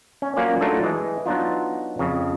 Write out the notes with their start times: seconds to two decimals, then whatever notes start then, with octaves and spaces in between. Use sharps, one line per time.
0.22 C#4
0.36 F#3 A#3 C#4 F4 C5 D5
0.61 F#3 A3 D4 D#4 F4 A4
0.84 E3 G#3
1.26 F#3 B3 D4 D#4 F4
1.99 F2 C#3